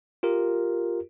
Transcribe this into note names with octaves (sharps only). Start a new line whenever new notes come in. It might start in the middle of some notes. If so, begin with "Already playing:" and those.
F4 G4 A#4